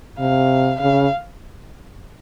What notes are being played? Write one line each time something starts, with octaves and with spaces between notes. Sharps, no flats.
C3 F5
C#3 F5